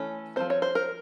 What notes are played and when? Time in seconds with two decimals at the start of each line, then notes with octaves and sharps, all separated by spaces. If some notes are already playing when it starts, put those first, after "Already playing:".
Already playing: E3 A3 C#4
0.36 F3 G#3 C4 C5
0.50 C#5
0.62 C5
0.75 A#4